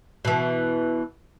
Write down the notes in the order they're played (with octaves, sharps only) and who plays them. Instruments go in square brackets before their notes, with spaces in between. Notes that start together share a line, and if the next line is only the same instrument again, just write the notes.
[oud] B2 E3